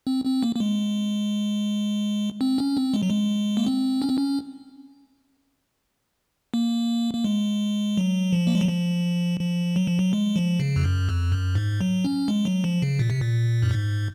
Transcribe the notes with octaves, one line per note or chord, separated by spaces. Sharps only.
C4
C4
A#3
A#3
G#3
C4
C#4
C4
G#3
F#3
G#3
A#3
C4
C#4
C4
C#4
A#3
A#3
G#3
F#3
F3
A#3
G#3
F#3
F3
F3
F#3
F3
F#3
G#3
F3
C#3
F2
F#2
F2
F#2
G#2
F#3
C#4
G#3
F#3
F3
C#3
A#2
C3
A#2
F#2
G#2